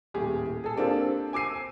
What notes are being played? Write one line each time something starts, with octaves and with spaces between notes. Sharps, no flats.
D#1 A2 G4 G#4
G#4 A4
A#3 C4 D4 F4 G4 A4
G#5 D6 E6 C7 D#7